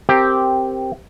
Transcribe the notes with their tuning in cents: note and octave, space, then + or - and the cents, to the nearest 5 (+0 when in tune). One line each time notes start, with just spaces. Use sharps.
C4 +0 G4 +0 A#4 -15